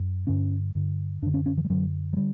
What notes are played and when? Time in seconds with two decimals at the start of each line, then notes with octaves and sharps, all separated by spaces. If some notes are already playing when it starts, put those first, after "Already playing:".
Already playing: F#2
0.27 G2 D3 C#4
0.75 G2 D3
1.22 F#2 D4
1.26 D3
1.34 C#4
1.46 C#4
1.57 E3
1.65 G3
1.70 F#2 D3 F#3
2.13 F#3
2.17 D3 G3